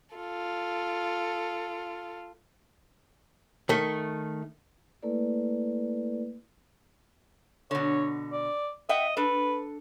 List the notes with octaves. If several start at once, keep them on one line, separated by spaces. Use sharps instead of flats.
F4 A4
D#3 A3
A3 A#3 E4 A4 B4 D5
B2 D3 C#5
D5
D#5 E5 F#5 G5
D4 A4 B4